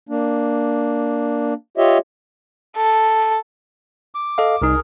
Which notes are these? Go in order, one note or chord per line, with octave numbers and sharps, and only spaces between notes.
A#3 D4
F4 G4 C#5 D#5 E5
A4
D6
A4 D#5 F5
C2 D#4 G#4 A#4